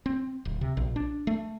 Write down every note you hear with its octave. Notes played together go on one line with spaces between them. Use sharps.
C4
D1
C3
A#1
D4
A3